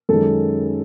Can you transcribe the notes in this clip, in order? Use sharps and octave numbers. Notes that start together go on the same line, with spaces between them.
F#2 D#3 G#3 A4